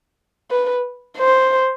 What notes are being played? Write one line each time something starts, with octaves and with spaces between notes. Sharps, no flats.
B4
C5